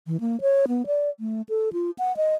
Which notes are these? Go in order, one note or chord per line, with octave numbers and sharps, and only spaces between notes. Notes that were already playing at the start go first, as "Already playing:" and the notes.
E3
A#3
C#5
B3
D5
A3
A4
F4
F#5
D#5